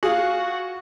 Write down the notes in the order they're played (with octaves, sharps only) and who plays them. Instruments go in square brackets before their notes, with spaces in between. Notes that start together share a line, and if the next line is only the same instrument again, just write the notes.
[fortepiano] F4 G#4 [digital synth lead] F#4